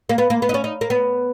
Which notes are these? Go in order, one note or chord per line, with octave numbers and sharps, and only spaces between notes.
A#3
B3
A#3
B3
D#4
C#4
D#4
A#3
B3